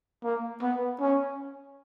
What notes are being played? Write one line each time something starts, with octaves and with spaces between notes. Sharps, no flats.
A#3
B3
C#4